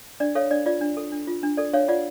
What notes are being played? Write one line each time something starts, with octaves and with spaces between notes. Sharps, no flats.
D4 D5
A4 C#5 F5
D4 D5
F4 D5
D4
A4
D4
F4
D4
A4 D5
D4 C#5 F5
F4 D5 F#5